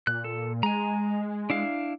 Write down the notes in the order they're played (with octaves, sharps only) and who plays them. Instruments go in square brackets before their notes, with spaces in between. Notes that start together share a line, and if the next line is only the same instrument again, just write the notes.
[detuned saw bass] A#2 [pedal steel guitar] F#6
[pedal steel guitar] A4
[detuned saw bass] G#3 [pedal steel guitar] G#5 A#5
[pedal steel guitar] D4 E4 F5